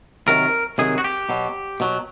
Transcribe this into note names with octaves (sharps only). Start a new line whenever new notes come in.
C3 D#3 F#3 A#4
C3 D#3 F#3 G#4
F#4
G4
B2 F#3
B2 F#3